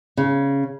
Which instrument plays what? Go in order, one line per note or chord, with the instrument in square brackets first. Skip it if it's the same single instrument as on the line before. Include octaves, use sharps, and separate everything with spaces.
[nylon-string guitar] C#3